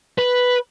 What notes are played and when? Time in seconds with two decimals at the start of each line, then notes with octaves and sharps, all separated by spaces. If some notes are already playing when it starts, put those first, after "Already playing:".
0.19 B4